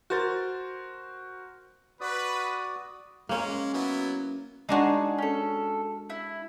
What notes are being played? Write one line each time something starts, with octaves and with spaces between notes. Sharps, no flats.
F#4 A#4 C5 A6
F#4 B4 D5 D#6
G#3 A#3 C#4
F#3 B3 E4
G#3 D4 D#4 F#4 G#4
C#4 A4
E4